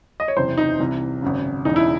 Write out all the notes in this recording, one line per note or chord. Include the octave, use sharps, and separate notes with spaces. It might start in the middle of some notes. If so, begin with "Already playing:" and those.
D#5
C#5
F#1 E2 C3 E3 C5
D#4
C2 C3 E3
G#1 F#2 C#3
E1 E2 C#3 E3 D#4
E4